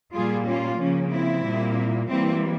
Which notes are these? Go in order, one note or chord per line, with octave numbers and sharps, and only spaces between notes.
A#2 G3 A#3 F4 G#4
C#4 F4
C#3 F3 A#3 C#4
C4 E4
A#2 G3 A#3
E3 G3 A#3 C4 E4